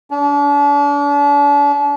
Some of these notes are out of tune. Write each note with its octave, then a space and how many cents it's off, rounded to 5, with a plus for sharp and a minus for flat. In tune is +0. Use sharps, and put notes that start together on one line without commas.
D4 -40